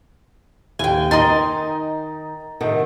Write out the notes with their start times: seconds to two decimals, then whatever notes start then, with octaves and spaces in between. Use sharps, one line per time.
0.79 D#2 G5 G#5
1.11 D#3 D#4 D#5 A#5 C6 A6 D#7
2.61 C3 D#3 A3 F#5